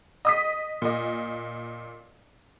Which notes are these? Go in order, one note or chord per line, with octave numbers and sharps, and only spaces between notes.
D#5 D#6 B6
A#2 D#5